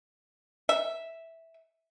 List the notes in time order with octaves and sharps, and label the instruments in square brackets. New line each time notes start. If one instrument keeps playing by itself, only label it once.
[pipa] E5